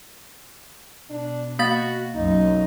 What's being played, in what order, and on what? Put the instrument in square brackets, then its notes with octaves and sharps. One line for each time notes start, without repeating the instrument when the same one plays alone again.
[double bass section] B2 [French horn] D4
[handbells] A#3 F5 A6 [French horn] F#4
[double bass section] B1 F#2 [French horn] D#4